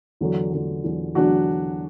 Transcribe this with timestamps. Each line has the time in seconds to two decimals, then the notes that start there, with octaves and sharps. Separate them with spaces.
0.21 E2 D3 F#3
0.53 E2 D3 F#3
0.84 E2 D3 F#3
1.15 E2 D3 F#3 D4 F#4